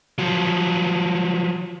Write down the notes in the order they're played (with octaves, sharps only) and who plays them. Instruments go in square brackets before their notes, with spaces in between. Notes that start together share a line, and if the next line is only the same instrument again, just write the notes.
[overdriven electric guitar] F3 F#3